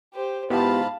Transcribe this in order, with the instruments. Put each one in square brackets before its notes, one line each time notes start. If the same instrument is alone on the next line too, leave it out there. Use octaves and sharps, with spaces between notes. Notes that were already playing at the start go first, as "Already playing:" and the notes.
[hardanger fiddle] G4 C5
[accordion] G#2 F4 B5 [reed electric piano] B3 E4 G4 [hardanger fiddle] F5 A5